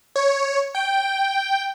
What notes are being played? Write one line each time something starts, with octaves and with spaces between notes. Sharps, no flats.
C#5
G5